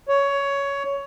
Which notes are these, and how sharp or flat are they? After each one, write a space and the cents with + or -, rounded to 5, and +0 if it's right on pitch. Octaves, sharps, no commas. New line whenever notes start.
C#5 +15